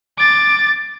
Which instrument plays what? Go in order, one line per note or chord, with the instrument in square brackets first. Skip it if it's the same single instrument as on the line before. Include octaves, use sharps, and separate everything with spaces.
[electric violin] D6 A6